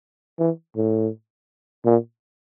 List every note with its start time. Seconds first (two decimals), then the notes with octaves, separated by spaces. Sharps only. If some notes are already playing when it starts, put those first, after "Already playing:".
0.39 E3
0.76 A2
1.85 A#2